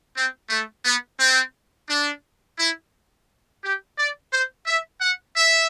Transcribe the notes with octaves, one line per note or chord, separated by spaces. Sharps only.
C4
A3
B3
C4
D4
E4
G4
D5
C5
E5
F#5
E5